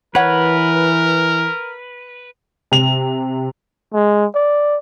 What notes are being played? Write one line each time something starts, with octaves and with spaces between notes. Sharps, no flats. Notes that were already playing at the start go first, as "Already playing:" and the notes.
E3 A#4 B4 C#5 F#5
C3 F7
G#3
D5